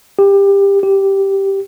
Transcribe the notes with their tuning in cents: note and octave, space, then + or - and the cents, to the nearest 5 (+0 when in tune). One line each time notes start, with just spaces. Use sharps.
G4 +20
G4 -5